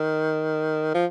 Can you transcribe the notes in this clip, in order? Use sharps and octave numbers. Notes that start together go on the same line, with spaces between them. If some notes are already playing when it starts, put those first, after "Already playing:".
Already playing: D#3
F3